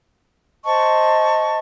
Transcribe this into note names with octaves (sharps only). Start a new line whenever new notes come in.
C5 D#5 A5 C#6